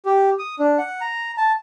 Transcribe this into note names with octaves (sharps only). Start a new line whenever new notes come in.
G4
D#6
D4
F#5
A#5
A5